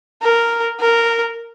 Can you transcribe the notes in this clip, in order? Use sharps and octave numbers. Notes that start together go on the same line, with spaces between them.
A#4
A#4